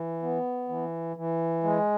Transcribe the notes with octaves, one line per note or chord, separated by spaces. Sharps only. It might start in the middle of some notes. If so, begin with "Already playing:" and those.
Already playing: E3
B3
E3
E3
G#3